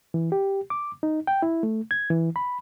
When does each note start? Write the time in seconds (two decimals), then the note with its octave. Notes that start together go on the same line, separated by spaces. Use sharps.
0.14 E3
0.32 G4
0.70 D6
1.03 D#4
1.27 G5
1.42 E4
1.63 A3
1.91 G#6
2.10 E3
2.36 B5